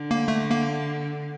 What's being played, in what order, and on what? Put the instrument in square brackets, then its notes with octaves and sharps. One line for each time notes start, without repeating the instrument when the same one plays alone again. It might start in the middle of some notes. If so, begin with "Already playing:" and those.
Already playing: [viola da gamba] D3
[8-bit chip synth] A#3
A3
A#3